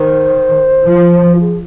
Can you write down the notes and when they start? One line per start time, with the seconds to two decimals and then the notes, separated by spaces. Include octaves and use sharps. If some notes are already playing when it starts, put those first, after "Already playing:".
Already playing: D#3 C5
0.86 F3
1.35 F4
1.41 G#4